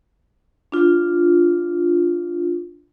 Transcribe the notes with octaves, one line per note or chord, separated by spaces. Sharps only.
D4 F4